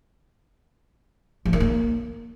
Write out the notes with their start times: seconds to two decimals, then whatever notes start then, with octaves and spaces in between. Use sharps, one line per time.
1.45 F3
1.53 D#3
1.60 A#3